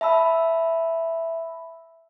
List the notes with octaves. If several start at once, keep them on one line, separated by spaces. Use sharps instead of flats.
E5 A5 B5 E6